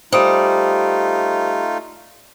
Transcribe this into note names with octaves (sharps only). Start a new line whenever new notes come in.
G3 A3 D#4 F4 C5 D#6 D7